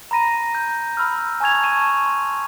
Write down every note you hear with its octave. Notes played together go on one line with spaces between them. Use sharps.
A#5 B5 A#6 D#7
G6
B5 E6 F6
G#5 A5 C#6 G#6 F7
A5 C#6 D#7 E7
C6